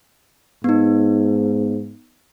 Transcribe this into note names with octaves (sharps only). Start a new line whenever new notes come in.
G#2 B3 D#4